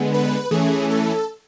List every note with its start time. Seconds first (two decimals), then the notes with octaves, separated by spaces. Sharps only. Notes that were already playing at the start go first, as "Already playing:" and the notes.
Already playing: D3 G#3 B3
0.14 B4
0.51 E3 A3 C#4 G#4
0.90 A4